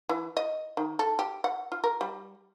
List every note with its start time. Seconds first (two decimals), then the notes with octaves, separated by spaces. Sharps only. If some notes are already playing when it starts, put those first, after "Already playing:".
0.09 E3
0.37 D#5
0.77 D#3
0.99 A4
1.19 G4
1.44 F#5
1.72 F4
1.84 A#4
2.01 G3